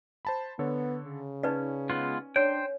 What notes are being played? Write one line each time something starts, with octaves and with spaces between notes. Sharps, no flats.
C5 A5 B5
D3 B3 A4 C#5
C#3
C#4 D#4 B4 D5
G#3 B3 F4
D4 C5 C#5 G5